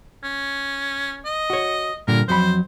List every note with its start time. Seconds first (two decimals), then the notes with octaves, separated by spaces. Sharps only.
0.24 C#4
1.25 D#5
1.50 F#4 C#5
2.08 G2 A#2 D3 A#4
2.28 F2 F#3 C5 B5